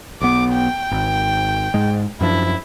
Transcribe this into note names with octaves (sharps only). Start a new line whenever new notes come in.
B1 B3 D6
G5
G#1
G#2 G#3
F#2 F3 D4 E4